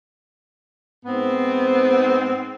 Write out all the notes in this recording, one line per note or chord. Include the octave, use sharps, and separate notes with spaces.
G#2 B3 C4